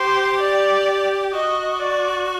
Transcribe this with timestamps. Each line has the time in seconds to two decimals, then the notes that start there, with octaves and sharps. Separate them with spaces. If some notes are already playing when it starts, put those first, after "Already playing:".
Already playing: G4 C5
0.39 D5
1.32 F#4 D#5
1.78 D5